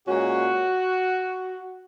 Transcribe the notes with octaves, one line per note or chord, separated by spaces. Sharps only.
A#2 G#3 C#4 F#4